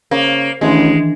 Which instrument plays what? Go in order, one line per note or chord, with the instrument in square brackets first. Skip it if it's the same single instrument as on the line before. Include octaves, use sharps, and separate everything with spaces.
[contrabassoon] C#3 [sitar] A#3 [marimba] C5
[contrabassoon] A1 [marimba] D#3 E3 D4 [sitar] G#3